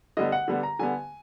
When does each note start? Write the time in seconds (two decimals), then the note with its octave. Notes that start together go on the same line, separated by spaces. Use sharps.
0.17 D3 G3 B3 D#5
0.32 F#5
0.48 D3 G3 B3
0.63 A#5
0.79 D3 G3 B3 G#5